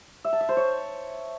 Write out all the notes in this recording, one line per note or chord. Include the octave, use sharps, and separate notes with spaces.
E5
A5
E5
C5
C#5